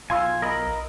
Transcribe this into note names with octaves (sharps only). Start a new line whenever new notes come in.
B1 F4 G#5 C6 E6
A#4 D#5 B5